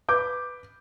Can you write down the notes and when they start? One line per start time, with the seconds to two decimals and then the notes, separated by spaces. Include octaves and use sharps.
0.09 B4 D6 G6